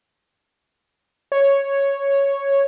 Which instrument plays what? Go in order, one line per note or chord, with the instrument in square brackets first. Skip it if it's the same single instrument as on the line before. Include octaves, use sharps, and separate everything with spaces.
[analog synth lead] C#5